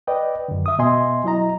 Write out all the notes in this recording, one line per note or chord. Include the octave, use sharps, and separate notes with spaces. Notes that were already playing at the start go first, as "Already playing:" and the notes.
B4 D5 D#5 G5
F#2 D3
E5 D#6
B2 B3 D#5 E5 G#5 C6
F#3 E4 D#5 A#5